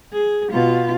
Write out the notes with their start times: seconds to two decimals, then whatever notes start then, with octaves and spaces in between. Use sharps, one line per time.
0.13 G#4
0.52 B2 F4